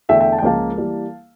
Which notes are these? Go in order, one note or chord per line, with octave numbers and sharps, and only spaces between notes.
E2 D3 A3 E5 G5
E5 G5
A5
G5
C#2 C#3 F3 A#3 F5 A5
E3 G3 A#3